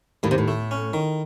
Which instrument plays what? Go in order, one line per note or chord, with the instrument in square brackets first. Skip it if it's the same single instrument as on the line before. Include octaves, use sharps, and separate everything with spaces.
[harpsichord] D#2 [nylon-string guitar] A2
[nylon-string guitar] C3
A2
[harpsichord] A3
C#4
D#3